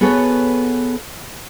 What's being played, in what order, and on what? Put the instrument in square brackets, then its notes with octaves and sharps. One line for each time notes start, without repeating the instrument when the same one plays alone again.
[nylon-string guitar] B3 F#4 G#4 A4 B4 C#5